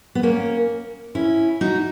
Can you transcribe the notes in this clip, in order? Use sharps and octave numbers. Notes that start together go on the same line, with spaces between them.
B3
A#3 C#4
C#4 E4
D#4 F#4